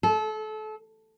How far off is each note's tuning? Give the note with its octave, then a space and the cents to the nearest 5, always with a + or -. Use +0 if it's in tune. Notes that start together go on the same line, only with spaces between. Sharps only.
A4 -30